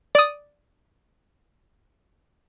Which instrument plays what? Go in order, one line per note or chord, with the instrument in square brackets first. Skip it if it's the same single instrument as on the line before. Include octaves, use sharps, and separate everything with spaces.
[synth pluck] D5 D#6